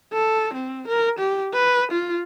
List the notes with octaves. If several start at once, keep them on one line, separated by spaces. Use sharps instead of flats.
A4
C4
A#4
G4
B4
F4